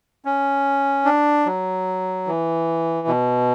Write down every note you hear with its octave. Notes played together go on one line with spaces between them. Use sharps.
C#4
D4
F#3
E3
B2